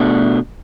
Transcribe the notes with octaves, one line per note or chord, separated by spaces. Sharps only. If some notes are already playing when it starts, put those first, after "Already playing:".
Already playing: B2 A3 D4